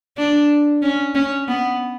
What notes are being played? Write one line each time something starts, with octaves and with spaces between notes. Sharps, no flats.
D4
C#4
C#4
B3